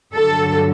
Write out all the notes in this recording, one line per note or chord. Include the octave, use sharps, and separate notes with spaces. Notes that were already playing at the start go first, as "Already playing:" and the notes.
G2 D3 F#3 A4